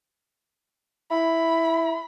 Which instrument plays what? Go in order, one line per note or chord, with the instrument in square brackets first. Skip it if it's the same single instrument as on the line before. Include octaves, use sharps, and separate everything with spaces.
[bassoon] E4 [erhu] B5